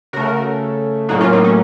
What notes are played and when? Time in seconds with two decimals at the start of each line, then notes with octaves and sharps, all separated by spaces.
0.13 C#3 A3 F#4 A#4
1.09 A2 F#3 A#3 D#4 F#4
1.20 C#4 F4
1.33 C4 D#4
1.44 C#4